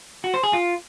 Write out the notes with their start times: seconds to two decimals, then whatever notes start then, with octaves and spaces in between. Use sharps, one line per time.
0.24 F#4
0.34 C5
0.44 G#4
0.53 F4